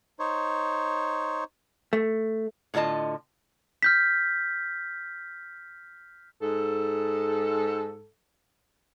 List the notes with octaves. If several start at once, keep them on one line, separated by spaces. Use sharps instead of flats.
D#4 C5 C#5
A3
A2 D3 F4 D#5 A5
F6 G6 B6
G#2 A4